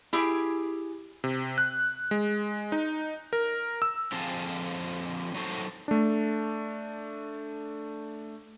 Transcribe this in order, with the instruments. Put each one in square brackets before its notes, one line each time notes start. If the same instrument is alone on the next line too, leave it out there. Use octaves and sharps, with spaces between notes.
[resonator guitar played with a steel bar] E4 G4 G#4
[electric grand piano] C3
F#6
G#3
D#4
A#4
E6
[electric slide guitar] D3 F3 C4 G#4 F5 A5
F#3 D#4 F#4 A4 C5
[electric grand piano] A3 D4